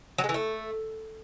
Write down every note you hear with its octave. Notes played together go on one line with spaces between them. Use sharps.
F#3
G#3
E3
A3